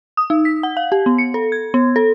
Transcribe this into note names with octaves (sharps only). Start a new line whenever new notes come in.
D#6
D#4
B6
F#5
F5
G4
B3
C#7
A4
G#6
B3
A4